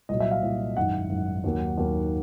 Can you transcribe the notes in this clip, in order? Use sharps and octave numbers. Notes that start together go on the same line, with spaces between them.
C2 A#2 F#3 D#5
E5
F5
C2 A#2 F#3
G#1 F#2 D#3 F#5
G#1 F#2 D#3
D#2 D#3 F#3 A#3
D#2 D#3 F#3 A#3